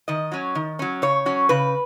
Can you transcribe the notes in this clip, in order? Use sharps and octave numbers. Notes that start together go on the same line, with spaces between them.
D#3 D#5
F#3 C#4
D#3
F#3 C#4
C#3 C#5
F#3 C#4
C#3 B4